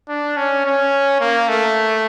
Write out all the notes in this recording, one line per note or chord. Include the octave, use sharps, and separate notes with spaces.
D4
C#4
C#4
A#3
A3